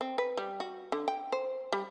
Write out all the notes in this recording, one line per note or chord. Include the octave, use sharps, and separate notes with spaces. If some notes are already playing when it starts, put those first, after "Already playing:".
C4
B4
G3
F#4
D3
G5
C5
G3